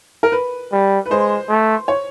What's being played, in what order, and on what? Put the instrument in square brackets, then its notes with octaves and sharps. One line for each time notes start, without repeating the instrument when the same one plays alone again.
[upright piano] A#4
B4
[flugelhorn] G3
[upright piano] B4
[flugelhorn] G#3 [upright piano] C5
[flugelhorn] A3
[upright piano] C#5